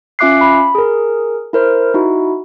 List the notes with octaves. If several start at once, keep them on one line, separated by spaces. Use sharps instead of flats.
C#4 F4 E5 D6 F#6 C7
B5
G#4 A#4
E4 A#4 C5
D#4 E4 F#4